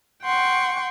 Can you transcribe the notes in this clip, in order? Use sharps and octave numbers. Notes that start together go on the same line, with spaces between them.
F#5 G5 C6 C#6